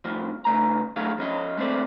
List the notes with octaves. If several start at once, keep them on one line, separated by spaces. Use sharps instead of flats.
F2 A2 F3
C#3 A3 A#5
F#3 A3 E4 G#4 F5
F3 C#4 D#5
G#3 A3 C4 C5 D5